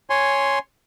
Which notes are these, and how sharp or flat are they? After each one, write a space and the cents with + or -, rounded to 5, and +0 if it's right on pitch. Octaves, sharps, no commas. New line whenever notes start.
C#5 +0 G#5 +0 C6 +0